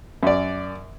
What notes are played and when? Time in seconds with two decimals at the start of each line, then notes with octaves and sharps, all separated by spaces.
0.23 F#2 D5